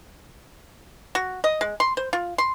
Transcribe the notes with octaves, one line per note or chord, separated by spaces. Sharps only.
F#4
D#5
G#3
C6
C5
F4
C6